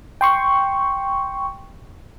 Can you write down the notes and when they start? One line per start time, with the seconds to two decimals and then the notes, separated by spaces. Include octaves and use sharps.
0.21 G5 C6 C#6